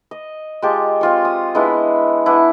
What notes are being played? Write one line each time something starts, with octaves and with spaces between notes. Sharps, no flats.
D#5
G#3 F4 G4 A5
C4 F4 C#5
D#6
G#3 B3 D4 E4
B3 D4 E4